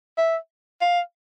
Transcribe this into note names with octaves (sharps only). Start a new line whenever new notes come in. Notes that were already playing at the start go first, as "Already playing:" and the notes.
E5
F5